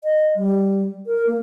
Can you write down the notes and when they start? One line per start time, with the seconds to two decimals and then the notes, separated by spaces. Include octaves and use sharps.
0.04 D#5
0.36 G3
1.07 A#4
1.27 A#3